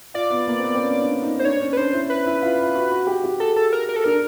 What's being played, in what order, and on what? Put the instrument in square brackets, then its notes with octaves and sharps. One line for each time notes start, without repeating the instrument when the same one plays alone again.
[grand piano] F4 [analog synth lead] D5
[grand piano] B3
A#3
C4
B3
C4
C#4
D4
D#4
[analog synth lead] C5
[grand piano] D4 [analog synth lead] C#5
[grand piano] C#4
[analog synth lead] B4
[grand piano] D4 [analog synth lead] C5
[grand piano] E4
[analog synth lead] B4
[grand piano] E4
F4
F4
F#4
F#4
G4
G4
[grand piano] G#4 [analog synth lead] A4
[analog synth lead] A4
A#4
A#4
A4
[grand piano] D4 [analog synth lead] A#4